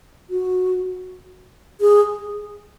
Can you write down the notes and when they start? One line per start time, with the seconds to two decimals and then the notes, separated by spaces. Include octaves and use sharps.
0.30 F#4
1.81 G#4